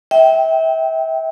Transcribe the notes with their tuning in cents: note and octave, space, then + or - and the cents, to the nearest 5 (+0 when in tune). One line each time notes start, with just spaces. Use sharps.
E5 -30 G5 -10